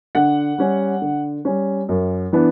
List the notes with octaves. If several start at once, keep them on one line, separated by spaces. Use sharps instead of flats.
D3 F#5
G3 C#4
D3
G3 C#4
F#2
E3 B3 D4